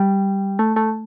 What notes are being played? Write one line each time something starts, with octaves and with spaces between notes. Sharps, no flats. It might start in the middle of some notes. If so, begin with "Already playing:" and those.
Already playing: G3
A3
A3